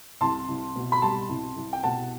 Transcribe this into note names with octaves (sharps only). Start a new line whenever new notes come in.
C2 A5 C6
C2
B2
B5
G3 A5 C6
C2
C2
G5
B2 F#5 A5